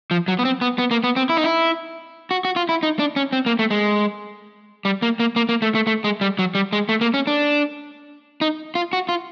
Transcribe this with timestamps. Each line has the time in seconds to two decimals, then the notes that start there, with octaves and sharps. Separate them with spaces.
0.11 F3
0.28 F#3
0.39 B3
0.45 C4
0.61 B3
0.78 B3
0.91 A#3
1.04 B3
1.16 C4
1.29 E4
1.37 D#4
1.44 E4
2.31 F#4
2.45 F#4
2.56 F4
2.69 E4
2.83 D#4
2.99 D4
3.16 C#4
3.33 C4
3.46 A#3
3.59 A3
3.71 G#3
4.85 G3
5.02 A#3
5.20 A#3
5.36 A#3
5.49 A#3
5.62 A3
5.75 A3
5.87 A3
6.04 G#3
6.21 G3
6.39 F#3
6.55 G3
6.73 G#3
6.89 A3
7.01 A#3
7.14 C#4
7.27 D4
8.41 D#4
8.75 F4
8.93 F#4
9.09 F4